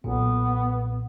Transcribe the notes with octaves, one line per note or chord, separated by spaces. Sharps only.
B1 A#2 B3